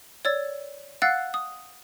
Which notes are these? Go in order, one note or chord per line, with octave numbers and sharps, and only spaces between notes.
C#5 D5 E6 A6
F5 F#5 E6 F#6 A6 C7
D#6